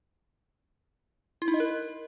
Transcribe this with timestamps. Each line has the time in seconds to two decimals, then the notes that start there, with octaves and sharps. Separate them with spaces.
1.42 E4
1.48 D#4
1.54 D#5
1.60 A#4